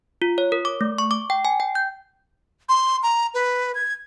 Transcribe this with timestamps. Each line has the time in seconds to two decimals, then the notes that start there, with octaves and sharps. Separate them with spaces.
0.22 F4
0.38 C#5
0.52 A#4
0.65 D6
0.81 A3
0.98 C#6
1.11 D6
1.30 G5
1.45 G#5
1.60 G5
1.75 G6
2.69 C6
3.03 A#5
3.34 B4
3.75 G#6